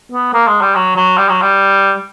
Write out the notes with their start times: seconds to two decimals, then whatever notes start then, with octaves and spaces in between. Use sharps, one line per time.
0.12 B3
0.33 A#3
0.48 G#3
0.61 G3
0.75 F#3
0.96 F#3
1.17 G3
1.29 F#3
1.42 G3